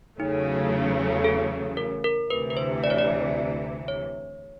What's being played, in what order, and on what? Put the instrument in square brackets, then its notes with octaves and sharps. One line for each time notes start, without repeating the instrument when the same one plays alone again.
[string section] E2 C#3 F#3 A3 [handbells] D#4
[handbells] A4
A#4
A#4
[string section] D2 C3 E3 [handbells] B4
[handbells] B4
C5
D5
C#5
D5
C#5